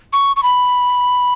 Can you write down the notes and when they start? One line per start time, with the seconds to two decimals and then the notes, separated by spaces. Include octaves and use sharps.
0.13 C#6
0.36 C#6
0.43 B5